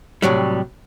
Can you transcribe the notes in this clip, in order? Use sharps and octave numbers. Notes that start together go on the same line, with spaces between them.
A2 C3 F#3 G3